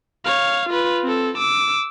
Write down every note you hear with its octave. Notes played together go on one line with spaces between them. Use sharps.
C#5 F5
F4 B4
C4 A4
D6 E6